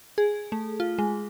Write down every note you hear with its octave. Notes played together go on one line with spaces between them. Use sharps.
G#4
A3
F4
G#3